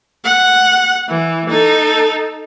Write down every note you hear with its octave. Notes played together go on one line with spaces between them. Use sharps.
F#5
E3
D#4 A4